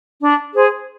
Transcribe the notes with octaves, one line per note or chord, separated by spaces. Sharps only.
D4
G#4 C5